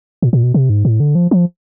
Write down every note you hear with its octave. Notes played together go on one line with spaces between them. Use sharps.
A#2
A#2
B2
C3
G#2
A2
D3
F3
F3